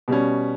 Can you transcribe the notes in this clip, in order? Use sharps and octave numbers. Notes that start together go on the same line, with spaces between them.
B2 G3 C#4